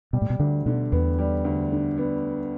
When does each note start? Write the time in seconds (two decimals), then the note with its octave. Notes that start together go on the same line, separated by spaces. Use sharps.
0.13 B2 G3
0.22 A2
0.30 B2
0.40 D2 D3
0.66 B2 D3
0.92 E2 B3
1.19 G3
1.44 D2
1.72 D3
1.98 B3